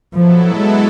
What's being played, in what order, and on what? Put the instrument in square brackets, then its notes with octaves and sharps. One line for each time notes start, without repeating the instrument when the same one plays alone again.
[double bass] F3 [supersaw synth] F#3 B3 E4 A4
[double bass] G#3